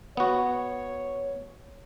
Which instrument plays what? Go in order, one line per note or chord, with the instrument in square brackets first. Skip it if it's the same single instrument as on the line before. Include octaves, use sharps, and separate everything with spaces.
[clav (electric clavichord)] B3 F#4 [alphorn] C#5